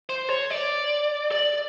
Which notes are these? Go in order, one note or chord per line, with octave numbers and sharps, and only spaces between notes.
C5
C#5
D5
D5